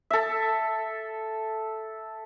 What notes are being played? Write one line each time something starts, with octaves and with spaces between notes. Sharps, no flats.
A4 E5